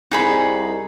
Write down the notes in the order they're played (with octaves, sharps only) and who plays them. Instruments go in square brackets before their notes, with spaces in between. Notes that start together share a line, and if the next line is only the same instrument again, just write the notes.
[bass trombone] C2 [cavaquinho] D#4 G#4 B5